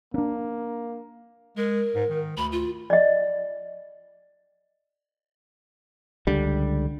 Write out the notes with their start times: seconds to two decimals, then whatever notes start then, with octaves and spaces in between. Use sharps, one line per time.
0.14 A#3 C#4 D4
1.57 G#3 A#4
1.95 G#2
2.10 D#3
2.37 D2 B5
2.52 F4
2.90 D5 D#5
6.27 C#2 D3 G3